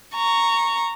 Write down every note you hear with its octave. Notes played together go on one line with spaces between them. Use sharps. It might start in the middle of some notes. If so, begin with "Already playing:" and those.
A#5 C#6